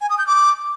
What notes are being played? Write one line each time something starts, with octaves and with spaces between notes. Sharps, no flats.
G#5
D#6
G6
D6